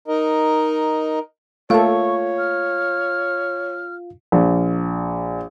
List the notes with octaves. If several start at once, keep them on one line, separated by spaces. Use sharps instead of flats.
D#4 A#4 D#5
A3 A#3 F4 A4 C#5 F5 C#6
F6
A#1